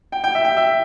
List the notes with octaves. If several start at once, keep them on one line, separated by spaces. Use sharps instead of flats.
G5
G5
E5
G5
E5